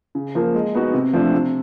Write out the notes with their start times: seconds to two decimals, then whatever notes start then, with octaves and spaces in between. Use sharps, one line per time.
0.15 C#3
0.35 F3 A#3
0.54 G#3
0.75 B3 D#4 F#4
0.94 C3
1.13 F3 A3 D4
1.33 C3